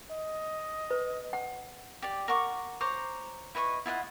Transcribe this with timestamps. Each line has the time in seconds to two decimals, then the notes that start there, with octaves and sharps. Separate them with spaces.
0.11 D#5
0.90 B4
1.33 F#5
2.02 G4 D5
2.28 A#4 F#5 C#6 D6
2.81 C5 C#5 A#5 D6
3.55 E4 B4 D#5 C#6
3.86 E4 F4 D#5 F#5